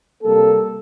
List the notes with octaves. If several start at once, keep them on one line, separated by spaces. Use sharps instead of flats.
C3 G3 A#3 A4